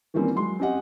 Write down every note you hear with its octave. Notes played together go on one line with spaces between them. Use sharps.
D#3 E3 G3 A#3 C4 C#4
F#3 G#3 C6
C4 C#4 G4 D#5 F#5